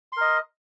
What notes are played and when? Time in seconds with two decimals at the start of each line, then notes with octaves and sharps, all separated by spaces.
0.13 C6
0.17 A#4
0.21 D#5